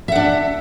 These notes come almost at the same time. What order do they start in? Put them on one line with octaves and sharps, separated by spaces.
E5 F#5 D4